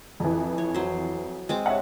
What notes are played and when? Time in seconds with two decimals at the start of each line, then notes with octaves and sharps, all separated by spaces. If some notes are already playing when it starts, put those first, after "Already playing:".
0.20 F2 E3
0.58 C#5
0.74 F#3 C5
1.49 G#3 C4 D6
1.66 C#5 E5 F#5